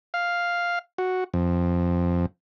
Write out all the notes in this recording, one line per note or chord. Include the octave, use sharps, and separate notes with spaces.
F5
F#4
F2